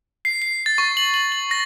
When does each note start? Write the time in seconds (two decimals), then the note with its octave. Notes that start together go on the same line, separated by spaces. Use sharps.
0.25 C7
0.42 C7
0.66 A6
0.78 C#6
0.97 F#7
1.14 F#7
1.32 F#7
1.51 A#6